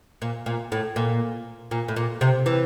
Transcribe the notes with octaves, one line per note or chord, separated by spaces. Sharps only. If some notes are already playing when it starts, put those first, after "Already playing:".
A#2
A#2
A2
A#2
A#2
A2
A#2
C3
E3